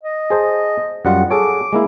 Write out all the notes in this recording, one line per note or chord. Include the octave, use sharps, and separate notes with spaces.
D#5
G#4 C5 A5
F#2 G3 F4 F#5
G#4 A4 C#5 D6
G#3 A#3 E4